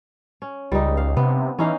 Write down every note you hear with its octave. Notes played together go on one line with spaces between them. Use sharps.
C#4
C#2 G3 D#4
F5
C3 B3
E3 C#4 D#4 F5